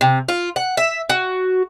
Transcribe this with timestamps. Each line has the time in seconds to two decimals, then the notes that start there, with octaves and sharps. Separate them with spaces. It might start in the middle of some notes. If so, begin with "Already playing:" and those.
0.01 C3
0.28 F4
0.56 F#5
0.77 E5
1.09 F#4